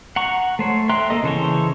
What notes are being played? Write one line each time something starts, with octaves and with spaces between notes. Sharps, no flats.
F#5 A#5 C#6
A3 C5 C#5
E5 G5 A#5 C6 F#6
A#3 A4 D#5
C#3 E3 A4 C5 C#5